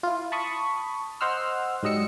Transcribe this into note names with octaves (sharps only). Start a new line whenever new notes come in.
E4 F4
A5 B5 C#6 D#6
C5 D#5 F#5 C6 E6 F6
G#2 F#3 G3 D#5 E6 C#7